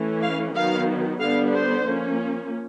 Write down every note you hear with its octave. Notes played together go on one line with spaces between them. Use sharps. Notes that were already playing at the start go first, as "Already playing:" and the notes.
Already playing: E3 A3 C#4
F5
D#3 F#3 B3 F5
D3 G3 B3 D4 F5
C5
F3 A#3 C#4